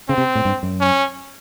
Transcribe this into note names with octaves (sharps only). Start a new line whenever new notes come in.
C#3 C4
C3
A2
G2
F#2
C#4